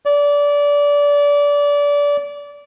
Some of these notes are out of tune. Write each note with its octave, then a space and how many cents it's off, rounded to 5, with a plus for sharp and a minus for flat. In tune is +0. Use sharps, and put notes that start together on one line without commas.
D5 -25